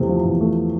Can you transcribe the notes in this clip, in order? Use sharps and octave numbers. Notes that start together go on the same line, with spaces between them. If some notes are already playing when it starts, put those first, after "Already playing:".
Already playing: E2 C3 A3
F3
E2
A3